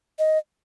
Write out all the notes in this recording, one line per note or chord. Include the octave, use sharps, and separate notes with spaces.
D#5